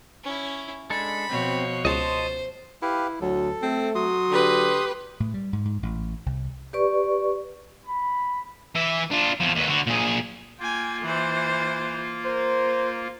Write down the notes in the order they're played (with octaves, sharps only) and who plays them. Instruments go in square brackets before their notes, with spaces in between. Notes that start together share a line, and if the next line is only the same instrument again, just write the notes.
[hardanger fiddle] C#4 E4
[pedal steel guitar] G#3 D4 A4 [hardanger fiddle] B5
[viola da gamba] B2 F3 C#5 [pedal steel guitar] C4
[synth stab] C#2 [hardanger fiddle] C5 [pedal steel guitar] D#5 A5 C6
[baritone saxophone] E4 [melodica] G4 B4 F5
[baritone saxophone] D2 [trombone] F#3 [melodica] A4
[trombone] A3 [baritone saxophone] C4
[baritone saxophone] F#3 [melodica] C6 D#6
[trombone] D3 [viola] G4 B4
[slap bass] A2
G3
G#2
G#2
A1
C2
[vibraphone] G4 B4 D5 C#6
[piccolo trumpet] B5
[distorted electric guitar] E3 E5
D4 F4
E2 F3
D#2 B4
D3 F#4
A#2 G#4
[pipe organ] A#3 F4 [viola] G5 G#5
[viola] E3 C5
[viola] A#4 [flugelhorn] C5